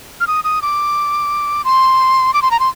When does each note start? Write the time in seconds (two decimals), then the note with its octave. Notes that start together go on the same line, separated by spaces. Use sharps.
0.20 F6
0.27 D#6
0.44 D#6
0.62 D6
1.65 C6
2.34 D6
2.42 C6
2.51 A#5
2.60 C6